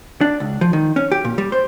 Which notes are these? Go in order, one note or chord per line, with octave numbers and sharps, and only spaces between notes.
D4
C#2
F3
D#3
C#4
G4
A#2
G3
C5